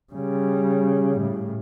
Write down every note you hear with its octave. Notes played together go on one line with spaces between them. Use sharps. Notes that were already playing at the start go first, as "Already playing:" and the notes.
C#3 G3
A2